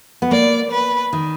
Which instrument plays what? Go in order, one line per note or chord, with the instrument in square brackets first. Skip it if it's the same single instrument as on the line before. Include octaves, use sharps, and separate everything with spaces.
[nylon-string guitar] B3
[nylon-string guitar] A#3 [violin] D5
[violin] B4
[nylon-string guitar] D#3